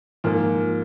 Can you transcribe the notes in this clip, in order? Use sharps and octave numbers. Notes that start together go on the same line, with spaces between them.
G#2 F3 A#3